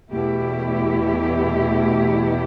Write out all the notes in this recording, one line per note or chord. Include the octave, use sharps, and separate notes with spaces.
E2 B2 A3 E4 G4